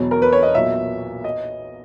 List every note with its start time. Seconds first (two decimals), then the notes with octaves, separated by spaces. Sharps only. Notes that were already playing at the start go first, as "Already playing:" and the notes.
Already playing: E1 E2 B2 F#3
0.11 A#4
0.22 B4
0.33 C#5
0.43 D#5
0.55 B1 A#2 F#3 E5
1.24 D#5